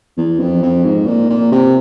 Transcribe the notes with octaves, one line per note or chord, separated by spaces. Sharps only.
E2
F2
F2
G#2
A#2
A#2
C3